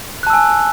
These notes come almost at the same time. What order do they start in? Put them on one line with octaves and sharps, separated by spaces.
F#6 A5 E6 G#5